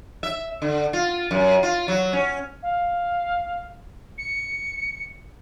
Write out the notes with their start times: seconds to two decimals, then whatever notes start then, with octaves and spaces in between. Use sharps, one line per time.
0.23 E5
0.62 D3
0.93 F4
1.31 F#2
1.63 F4
1.88 F#3
2.13 C#4
2.63 F5
4.18 C#7